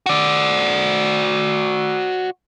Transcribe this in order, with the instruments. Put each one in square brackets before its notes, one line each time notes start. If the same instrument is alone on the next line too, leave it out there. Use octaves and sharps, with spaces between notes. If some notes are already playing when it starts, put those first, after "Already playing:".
[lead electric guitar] F#4 D5